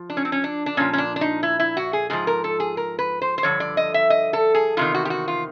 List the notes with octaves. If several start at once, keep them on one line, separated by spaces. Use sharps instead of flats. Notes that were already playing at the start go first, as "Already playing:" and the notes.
Already playing: F3
D4
C#4
C4
C#4
D4
D4
A#2 F3 C#4
C#4
D4
D4
D#4
E4
E4
F#4
G#4
G#2 F3 G#4
A#4
A4
G#4
A#4
B4
C5
C5
G2 D3 F3 C#5
D5
D#5
E5
D#5
A4
G#4
E2 C3 D#3 F4
F#4
G4
F#4
F4